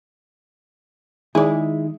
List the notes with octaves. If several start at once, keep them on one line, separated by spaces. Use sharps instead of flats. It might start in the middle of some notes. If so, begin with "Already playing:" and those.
D#3 G#3 D#4 E4 G#4 D5